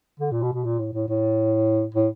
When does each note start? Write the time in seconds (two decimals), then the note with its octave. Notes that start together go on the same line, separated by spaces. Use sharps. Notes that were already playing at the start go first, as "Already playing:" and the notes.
0.20 D3
0.32 A#2
0.42 B2
0.53 B2
0.65 A#2
0.79 A2
0.93 A2
1.08 A2
1.95 A2